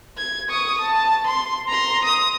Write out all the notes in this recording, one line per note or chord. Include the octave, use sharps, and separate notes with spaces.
G#6
C#6 D#6
A5
C6
A#5 C6
D#6